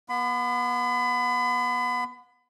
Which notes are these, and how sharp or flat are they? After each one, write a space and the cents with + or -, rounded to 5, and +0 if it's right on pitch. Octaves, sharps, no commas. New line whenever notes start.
B3 -30 B5 +35